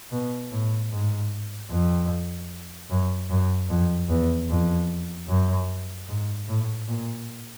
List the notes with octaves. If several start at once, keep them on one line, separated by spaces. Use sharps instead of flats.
B2
A2
G#2
F2
F#2
F#2
F2
E2
F2
F#2
G#2
A2
A#2